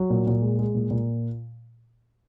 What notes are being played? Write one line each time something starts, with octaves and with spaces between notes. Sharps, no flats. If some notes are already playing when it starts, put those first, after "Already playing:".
Already playing: F#3
A#2
A#2
G#3
G#3
A#2
A#2